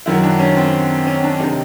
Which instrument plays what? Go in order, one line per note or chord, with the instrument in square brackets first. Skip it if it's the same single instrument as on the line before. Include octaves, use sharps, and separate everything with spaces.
[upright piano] F#2 D#3 F#3 E4
D4
C#4
C4
C#4
D4
C3 D#3 D#4